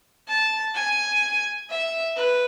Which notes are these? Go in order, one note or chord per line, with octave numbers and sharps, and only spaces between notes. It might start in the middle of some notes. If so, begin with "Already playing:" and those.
A5
G#5
E5
B4